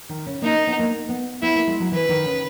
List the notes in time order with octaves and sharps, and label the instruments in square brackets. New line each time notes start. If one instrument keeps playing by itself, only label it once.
[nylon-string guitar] D#3
C#3
[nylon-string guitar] A#3 [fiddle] D#4
[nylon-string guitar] C#4
B3
A#3
B3
[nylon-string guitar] B3 [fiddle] E4
[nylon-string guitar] A#3
G#3
F#3
[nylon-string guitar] E3 [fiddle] B4
[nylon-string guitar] D#3
C#3